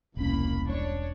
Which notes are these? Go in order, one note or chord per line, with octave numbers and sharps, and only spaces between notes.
E1 C2 A#3 C#4 B5
D4 C#5